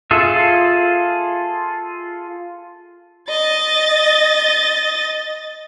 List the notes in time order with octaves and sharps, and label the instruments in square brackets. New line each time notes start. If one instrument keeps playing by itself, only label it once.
[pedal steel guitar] F4 G#4 A4 E5
[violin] D#5 A6